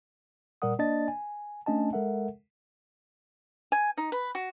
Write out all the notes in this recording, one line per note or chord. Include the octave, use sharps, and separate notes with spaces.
A#2 G3 A#4 D5 F#5 D#6
A#3 D4 D5 D#5 A5 A6
G#5
A3 C#4 D4 D#5 G#5 A5
G#3 A4 A#4 E5 F#5
G#5
D#4
B4
F#4